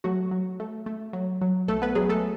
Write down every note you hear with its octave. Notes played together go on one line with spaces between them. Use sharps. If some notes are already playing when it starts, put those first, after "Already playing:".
F#3 A3 F#4
F#3
A3
A3
F#3
F#3
B1 A3 A4
B3 B4
F#3 G#3 G#4
A3 A4